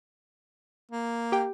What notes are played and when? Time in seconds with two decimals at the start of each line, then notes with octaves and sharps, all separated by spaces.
0.91 A#3
1.32 G4 G5